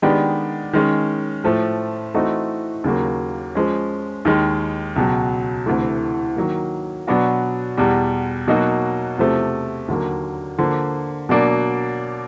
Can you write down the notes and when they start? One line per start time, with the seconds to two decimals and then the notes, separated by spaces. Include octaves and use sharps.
0.02 D#3 G#3 B3 D4 G4
0.73 D#3 G#3 C#4
1.44 A2 F3 A3
2.14 E3 A3 C4 D#4 F#4
2.84 D#2 C#3 F#3 A#3
3.55 F3 G#3 C#4
4.25 D#2 D#3 G#3
4.96 C#2 B2 F#3
5.66 D2 C3 E3 A3
6.36 D#3 F#3 A#3
7.07 B2 F#3 B3 D4 F#4
7.77 E2 B2 G3
8.48 B2 F#3 A#3 D#4 F#4
9.18 E2 C3 F3 A3
9.88 D#2 D3 F#3 A#3
10.59 D3 F3 A#3
11.29 B2 F#3 A#3 D4